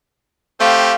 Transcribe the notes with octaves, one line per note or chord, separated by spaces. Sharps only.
A3 C4 G4 F5